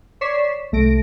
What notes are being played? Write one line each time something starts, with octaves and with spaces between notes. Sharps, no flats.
C#5 D5 C#6 B6 C7 E7
C2 A3 A#6 D7